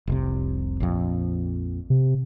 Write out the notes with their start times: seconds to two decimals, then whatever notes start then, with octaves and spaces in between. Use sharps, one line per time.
0.07 F1 C2 C3
0.80 A#1 F2
1.90 C3